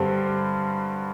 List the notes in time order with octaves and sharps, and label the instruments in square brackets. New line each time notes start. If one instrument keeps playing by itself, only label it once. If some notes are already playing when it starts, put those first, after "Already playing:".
Already playing: [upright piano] G2 D3 G3 C4